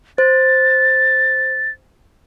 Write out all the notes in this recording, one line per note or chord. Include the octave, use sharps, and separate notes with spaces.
C5 A6